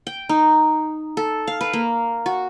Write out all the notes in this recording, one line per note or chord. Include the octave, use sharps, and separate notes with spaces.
G5
D#4
A4
F5
B4
A#3
F#4